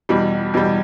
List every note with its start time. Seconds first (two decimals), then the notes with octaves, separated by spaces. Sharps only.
0.09 E2 B2 G3
0.54 E2 B2 G3